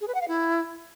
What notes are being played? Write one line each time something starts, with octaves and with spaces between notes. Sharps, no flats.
G#4
B4
F#5
F5
E4